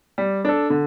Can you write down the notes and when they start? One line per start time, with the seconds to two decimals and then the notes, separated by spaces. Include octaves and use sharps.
0.18 G3
0.45 D4 A4
0.70 D3